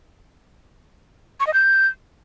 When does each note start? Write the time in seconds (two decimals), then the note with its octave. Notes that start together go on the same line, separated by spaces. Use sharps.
1.40 C#6
1.47 D#5
1.54 G6